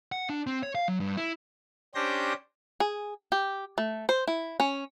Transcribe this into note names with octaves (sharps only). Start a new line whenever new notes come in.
F#5
D4
C4
C#5
F5
F#3
G2
E4
C#4 D4 G4 C5 G6 A#6
G#4
G4
A3
C5
E4
C#4